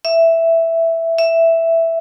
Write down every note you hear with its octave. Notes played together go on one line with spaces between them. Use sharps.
E5
E5